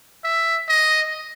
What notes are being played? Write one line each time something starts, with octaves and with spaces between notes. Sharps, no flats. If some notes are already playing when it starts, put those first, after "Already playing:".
E5
D#5